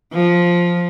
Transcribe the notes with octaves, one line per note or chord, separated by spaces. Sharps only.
F3